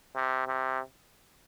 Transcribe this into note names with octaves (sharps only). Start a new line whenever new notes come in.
C3
C3